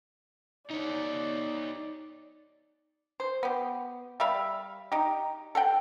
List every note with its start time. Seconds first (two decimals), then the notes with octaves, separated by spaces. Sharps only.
0.70 D#4 C#5 D5
3.20 C5
3.43 B3 G4
4.20 G3 E5 F5 B5
4.92 D#4 G4
5.55 A4 F#5 G5